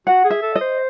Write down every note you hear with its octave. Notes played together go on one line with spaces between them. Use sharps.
F#4 F#5
G#4
E5
A4
D#5
C5